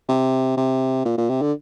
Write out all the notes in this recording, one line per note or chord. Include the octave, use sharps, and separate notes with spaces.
C3
C3
A#2
A#2
C3
D3